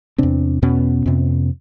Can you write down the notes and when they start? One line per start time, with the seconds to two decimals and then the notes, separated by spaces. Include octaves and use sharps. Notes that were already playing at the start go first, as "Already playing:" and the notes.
0.18 E2 C3 C4 D4
0.62 E2 B2 B3 C#4
1.06 F2 C3